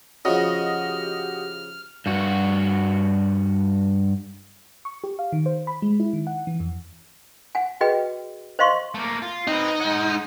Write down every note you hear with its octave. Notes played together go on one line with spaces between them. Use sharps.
C#3 F3 F#4 G#4 D#5 F6
G4
G2 F#4
C#6
G4
F5
D#3
C5
B5
G#3
E4
D#3
F#5
E3
F2
F#5 G#5
F#4 G#4 B4 D#5 G5
C5 D#5 F5 C6 C#6
A3 A#3
F4
C4 D#4 B4
G#3 F#5